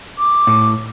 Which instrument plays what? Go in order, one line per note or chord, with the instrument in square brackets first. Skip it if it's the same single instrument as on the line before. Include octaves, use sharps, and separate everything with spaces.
[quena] D6
[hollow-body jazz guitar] A2